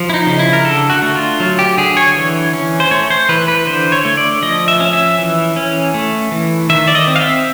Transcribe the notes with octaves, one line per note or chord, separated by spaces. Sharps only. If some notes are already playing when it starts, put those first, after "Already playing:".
Already playing: F3
E4
D#4
C#3
E4
A#4
D3 A4
F#4
A3
F4
F#3
G4
D3 G#4
C#5
E3
C#4
C5
A3 C#5
C5
E3 B4
B4
D3 C5
C#5
A3
D5
F3 D#5
E5
C#4
E5
E3
C#4
A3
E3
D#3 E5
D5
D#5
C4
F5
E5